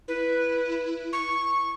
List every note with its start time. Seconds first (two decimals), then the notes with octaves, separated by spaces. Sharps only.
0.08 E4 B4
1.13 C#6